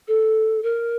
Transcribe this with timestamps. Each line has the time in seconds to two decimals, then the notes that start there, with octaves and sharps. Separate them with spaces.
0.08 A4
0.63 A#4